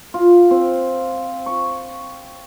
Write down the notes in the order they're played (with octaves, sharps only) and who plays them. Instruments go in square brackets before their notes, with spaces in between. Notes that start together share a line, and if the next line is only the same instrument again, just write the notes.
[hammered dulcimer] F4
C4
C#6